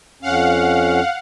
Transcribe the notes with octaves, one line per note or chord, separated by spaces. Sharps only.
F2 C#4 F5 F#5